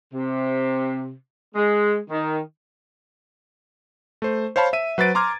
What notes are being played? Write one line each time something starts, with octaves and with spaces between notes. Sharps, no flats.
C3
G#3
D#3
A3 C5
C5 C#5 F5 A5 B5
E5 D#7
F#3 B4 C5 A6 D7
A#5 C6 D6 F6 G#6